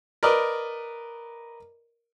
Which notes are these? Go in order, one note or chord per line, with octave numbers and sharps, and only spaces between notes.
A#4 B4 D5 D#5